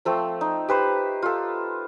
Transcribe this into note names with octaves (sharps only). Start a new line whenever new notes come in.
F3 A3 C4 G5
D#4
G4 B4 C5
F4 A4